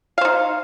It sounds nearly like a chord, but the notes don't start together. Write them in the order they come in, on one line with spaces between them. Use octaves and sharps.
F5 C5 D#4